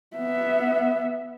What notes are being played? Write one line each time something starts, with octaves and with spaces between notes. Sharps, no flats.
B3 E5